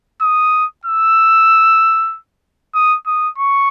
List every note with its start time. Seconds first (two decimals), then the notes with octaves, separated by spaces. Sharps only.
0.22 D#6
0.85 E6
2.75 D#6
3.07 D#6
3.38 C#6